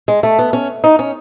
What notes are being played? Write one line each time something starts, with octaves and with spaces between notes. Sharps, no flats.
G#3
A3
B3
C#4
D#4
C#4